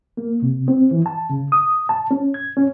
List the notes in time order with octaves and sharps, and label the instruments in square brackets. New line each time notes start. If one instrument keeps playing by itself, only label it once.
[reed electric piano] A#3
C3
C4
E3
A5
C#3
D#6
A5
C#4
G#6
C#4